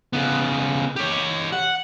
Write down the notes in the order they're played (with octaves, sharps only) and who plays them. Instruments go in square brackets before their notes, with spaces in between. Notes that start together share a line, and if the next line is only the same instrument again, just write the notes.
[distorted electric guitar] C#3 B3
G4 C#5
F#5